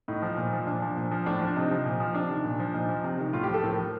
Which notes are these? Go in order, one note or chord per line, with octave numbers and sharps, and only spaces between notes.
A2 D#4
F3
A#2
F3
A#2 D4
F3
A#2
F3
A2 D4
F3 D4
C3 D#4
F3
A#2
F3
C3 D4
D#3
A#2
F3
A#2 D#4
F3
C3
D#3
A2 F4
G4
F3
A4
A2 A#4
F3